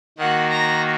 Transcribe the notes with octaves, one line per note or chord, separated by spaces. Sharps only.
D#3 A#3 F#4 F#5
A#5